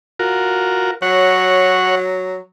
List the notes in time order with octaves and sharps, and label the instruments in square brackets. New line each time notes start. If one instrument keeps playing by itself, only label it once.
[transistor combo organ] F4 F#4 A#4
[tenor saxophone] F#3 [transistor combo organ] C#5 F#5